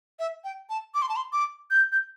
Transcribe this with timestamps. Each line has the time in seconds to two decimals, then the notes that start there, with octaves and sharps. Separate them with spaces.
0.19 E5
0.44 G5
0.70 A5
0.95 D6
1.02 C6
1.09 A5
1.16 C6
1.33 D6
1.71 G6
1.92 G6